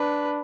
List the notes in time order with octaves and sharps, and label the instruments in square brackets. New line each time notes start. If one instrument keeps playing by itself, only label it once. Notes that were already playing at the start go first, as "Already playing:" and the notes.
Already playing: [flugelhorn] D4 [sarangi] B4